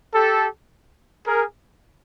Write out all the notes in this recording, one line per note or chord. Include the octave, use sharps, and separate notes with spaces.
G4 A4
G#4 A#4